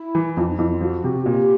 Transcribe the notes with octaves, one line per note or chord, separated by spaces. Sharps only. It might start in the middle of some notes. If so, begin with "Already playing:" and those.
Already playing: E4
E3
F2 F4
D#4
F2 E4
F4
F3 F#4
C3
A#2 G4